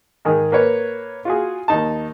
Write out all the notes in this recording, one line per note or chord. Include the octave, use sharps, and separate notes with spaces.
G#2 D#3 G#4
A#3 B4 C#5
F4 F#4 G#4
D#2 D#4 A5